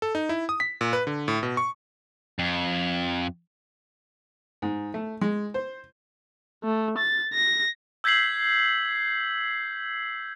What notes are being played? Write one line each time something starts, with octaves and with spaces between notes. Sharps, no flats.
A4
D#4
E4
D#6
B6
A#2
B4
D3
A2
B2
C#6
F2
G#2
A3
G#3
C5
A3
A6
A#6
E6 G6 G#6 B6 C7 F#7